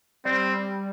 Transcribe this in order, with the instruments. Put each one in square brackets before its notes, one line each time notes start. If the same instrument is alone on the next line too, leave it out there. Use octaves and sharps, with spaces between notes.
[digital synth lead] G3 [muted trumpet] C4